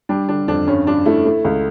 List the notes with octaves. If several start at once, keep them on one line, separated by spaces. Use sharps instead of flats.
G3 D4
D3 D4
F2 D4
G2 C#4
G2 D4
A3 E4
A3
C#2